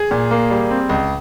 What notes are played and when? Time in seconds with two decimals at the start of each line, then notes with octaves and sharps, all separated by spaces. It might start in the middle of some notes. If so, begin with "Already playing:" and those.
Already playing: G#4
0.11 A#2
0.31 A#3
0.51 G3
0.71 C4
0.89 C#2